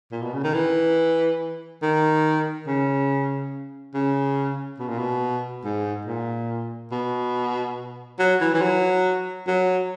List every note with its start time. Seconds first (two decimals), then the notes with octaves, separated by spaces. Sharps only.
0.12 A#2
0.22 B2
0.33 C#3
0.44 D#3
0.54 E3
1.82 D#3
2.67 C#3
3.94 C#3
4.79 B2
4.89 A#2
4.99 B2
5.64 G#2
6.06 A#2
6.91 B2
8.19 F#3
8.41 E3
8.54 E3
8.62 F#3
9.47 F#3